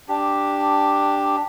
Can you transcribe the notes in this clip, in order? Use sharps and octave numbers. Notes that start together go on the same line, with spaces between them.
D4 G4